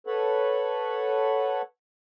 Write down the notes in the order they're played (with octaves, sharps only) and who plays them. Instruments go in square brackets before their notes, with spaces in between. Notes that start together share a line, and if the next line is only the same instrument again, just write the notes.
[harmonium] A4 B4 C#5 F#5